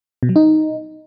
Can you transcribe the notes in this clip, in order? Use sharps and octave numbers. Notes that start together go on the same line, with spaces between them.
B2
F#3
D#4